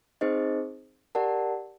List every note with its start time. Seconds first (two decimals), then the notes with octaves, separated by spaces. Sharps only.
0.21 C4 D#4 G#4 C5 D#5
1.15 G4 A#4 D5 F#5 A5